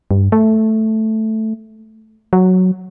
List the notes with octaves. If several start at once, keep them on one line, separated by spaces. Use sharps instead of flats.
G2
A3
F#3